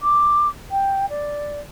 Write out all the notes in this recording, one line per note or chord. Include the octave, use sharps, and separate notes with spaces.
D6
G5
D5